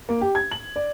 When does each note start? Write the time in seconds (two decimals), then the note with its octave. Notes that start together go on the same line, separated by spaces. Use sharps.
0.09 A#3
0.21 G4
0.35 G#6
0.51 F#7
0.76 D5